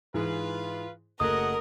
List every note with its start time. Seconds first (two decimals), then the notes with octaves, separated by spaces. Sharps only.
0.14 G#2 E3 F4 G#4 B4
1.20 F#1 F#3 A3 A#4 D#5 F#5 D#6